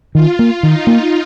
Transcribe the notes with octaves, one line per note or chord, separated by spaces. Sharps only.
D#3 F4
A#3
D#3 D#4
A#3